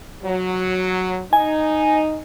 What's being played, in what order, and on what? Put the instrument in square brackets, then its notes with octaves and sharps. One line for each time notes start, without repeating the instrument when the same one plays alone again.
[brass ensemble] F#3
[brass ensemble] D#4 [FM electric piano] G#5